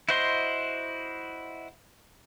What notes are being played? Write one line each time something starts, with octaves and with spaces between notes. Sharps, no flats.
E4 F#4 C5 D#5 C6